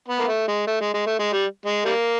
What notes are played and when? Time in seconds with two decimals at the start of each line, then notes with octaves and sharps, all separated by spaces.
0.08 B3
0.19 A#3
0.28 A3
0.48 G#3
0.67 A3
0.81 G#3
0.94 G#3
1.06 A3
1.19 G#3
1.33 G3
1.66 G#3
1.85 G3 A#3